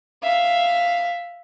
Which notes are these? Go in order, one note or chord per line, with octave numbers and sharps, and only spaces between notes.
E5 F5